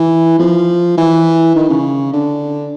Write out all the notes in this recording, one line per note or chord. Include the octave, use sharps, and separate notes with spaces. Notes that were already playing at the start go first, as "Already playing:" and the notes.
Already playing: E3
F3
E3
D#3
C#3
D3